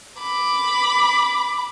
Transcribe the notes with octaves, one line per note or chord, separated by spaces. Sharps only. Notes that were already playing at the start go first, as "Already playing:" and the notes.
B5 D6